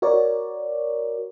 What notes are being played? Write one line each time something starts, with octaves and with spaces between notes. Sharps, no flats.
F#4 A#4 C#5 D5